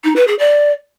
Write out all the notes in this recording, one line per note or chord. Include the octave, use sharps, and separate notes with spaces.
D#4
B4
G#4
D5